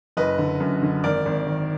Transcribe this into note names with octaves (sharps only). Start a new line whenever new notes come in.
F#1 B4 D#5
D3
F#2
D3
G#1 A#4 D5
G#1
D#3